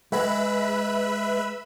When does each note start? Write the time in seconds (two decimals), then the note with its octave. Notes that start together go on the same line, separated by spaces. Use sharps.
0.12 G#3 B4 E5 B5